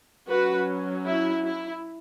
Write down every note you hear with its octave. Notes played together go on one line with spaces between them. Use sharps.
F#3 C#4 F#4 B4
E4
E4